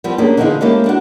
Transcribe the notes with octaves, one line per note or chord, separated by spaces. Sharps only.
F3 G3 B3 C4
A#3 C#4 D4 G4 G#4
D3 E3 F3 B3 D#4 G#4
G#3 A#3 C#4 E4 G4 A4
D4 F#4